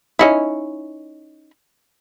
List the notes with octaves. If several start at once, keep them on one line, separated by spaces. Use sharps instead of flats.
C#4 D#4 E4